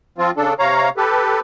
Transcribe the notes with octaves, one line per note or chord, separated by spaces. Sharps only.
F3 C4 F4
C#3 D4 A4
C3 C#5 F5 A#5
G4 A4 B4